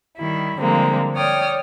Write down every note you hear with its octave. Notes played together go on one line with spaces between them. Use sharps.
D#3 G3 E4
D3 F3 G3 G#3 A#3 C4
C#5 D5 G5 D#6 F6